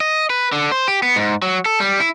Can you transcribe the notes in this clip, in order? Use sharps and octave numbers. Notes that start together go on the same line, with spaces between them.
D#5
B4
D3
C5
G4
B3
G#2
F#3
A4
G3
E4